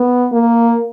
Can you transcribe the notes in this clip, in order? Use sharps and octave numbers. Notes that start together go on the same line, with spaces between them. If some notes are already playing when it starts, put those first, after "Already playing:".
Already playing: B3
A#3